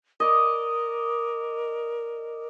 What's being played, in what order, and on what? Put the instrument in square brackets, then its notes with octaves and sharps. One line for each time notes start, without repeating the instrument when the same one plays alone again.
[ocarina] A#4 [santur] D5 D#5